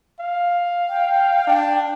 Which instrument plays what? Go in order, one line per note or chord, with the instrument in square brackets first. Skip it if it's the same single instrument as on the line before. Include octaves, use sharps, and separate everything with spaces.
[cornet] F5
[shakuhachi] G5
[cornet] D4